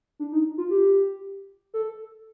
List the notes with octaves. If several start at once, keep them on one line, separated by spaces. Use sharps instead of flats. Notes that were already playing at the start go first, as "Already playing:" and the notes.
D4
D#4
F4
G4
A4